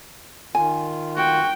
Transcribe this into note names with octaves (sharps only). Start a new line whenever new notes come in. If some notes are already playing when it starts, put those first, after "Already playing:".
D#3 F4 G#5
F#4 G5